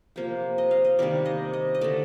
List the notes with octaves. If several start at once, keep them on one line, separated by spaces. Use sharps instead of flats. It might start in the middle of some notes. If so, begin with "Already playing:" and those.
C3 F3 A#3 G5
D#5
F5
D#5
C3 D#3 G3 A#3 D5
D#5
D#5
D#5
D3 A3 D5